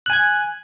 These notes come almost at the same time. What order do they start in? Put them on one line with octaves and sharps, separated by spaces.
F#6 G#5 G#6